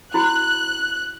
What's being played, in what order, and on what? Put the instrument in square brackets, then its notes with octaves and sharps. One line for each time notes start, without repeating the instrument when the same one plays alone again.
[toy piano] E4 F#4 B5 [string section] F#6